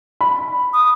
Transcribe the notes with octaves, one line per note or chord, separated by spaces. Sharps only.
B5
D#6